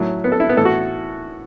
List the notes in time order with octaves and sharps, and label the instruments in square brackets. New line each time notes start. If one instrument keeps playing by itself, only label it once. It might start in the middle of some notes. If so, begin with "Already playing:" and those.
Already playing: [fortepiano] A2 F#3
B3
A4
E4
B3
A2 E3 A4
F#4